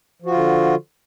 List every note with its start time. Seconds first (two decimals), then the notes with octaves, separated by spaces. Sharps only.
0.22 F3
0.26 F#4
0.30 F4
0.34 D3